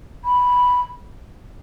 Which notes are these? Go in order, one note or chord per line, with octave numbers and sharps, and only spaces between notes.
B5